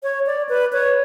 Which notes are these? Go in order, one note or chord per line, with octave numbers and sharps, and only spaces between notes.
C#5
D5
B4
C#5